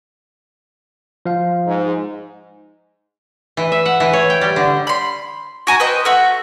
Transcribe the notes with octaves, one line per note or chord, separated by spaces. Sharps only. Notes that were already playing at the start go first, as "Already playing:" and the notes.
F3 F5
G#2
E3
E5
F#5
E3
C#5
G5
G3
D3
B5 C6
F#4 G#5 A#5
B4 C5 D#5 G5
A3 F#4 E5